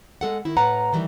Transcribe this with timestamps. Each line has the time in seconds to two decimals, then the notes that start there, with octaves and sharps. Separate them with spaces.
0.21 G#3 A4 F#5
0.45 D#3 E4
0.57 A2 B4 F#5 A#5
0.93 D#3 E3 G3